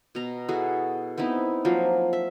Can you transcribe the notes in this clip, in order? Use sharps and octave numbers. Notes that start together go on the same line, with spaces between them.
B2 A#5
E4 F#4 G#4 A4
B3 C4 D#4 E4
F3 F#3 A#3
E5